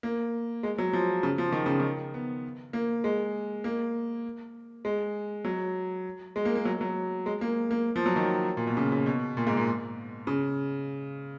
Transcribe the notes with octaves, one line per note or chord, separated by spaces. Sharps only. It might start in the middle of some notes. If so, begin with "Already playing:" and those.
A#3
G#3
F#3
F3
C#3
F3
D#3
C#3
D#3
B3
A#3
G#3
A#3
G#3
F#3
G#3
A#3
A#3
F#3
F#3
G#3
A#3
A#3
F3
F#3
D#3
A#2
B2
C#3
C#3
B2
A#2
G#2
A#2
C#3